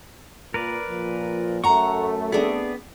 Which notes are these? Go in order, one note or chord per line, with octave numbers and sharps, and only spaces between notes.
A#2 A#4 B4 D5
A#2 F3
F#2 A3 F#5 A#5 C#6
B3 C4 D4 G#4